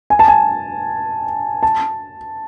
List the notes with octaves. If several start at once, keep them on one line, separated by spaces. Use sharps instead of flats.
G#5
A5
G#5
A5